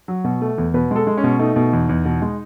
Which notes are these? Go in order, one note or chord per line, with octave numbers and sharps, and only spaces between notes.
F#3
B2
A3
E2
B2 B4
G#3 A4
G#3
C#4
B2
A3 D#4
B2
E2
E2
B2
G#3